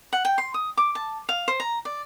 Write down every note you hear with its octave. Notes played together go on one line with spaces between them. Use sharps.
F#5
G5
C6
D#6
D6
A5
F5
C5
A#5
D5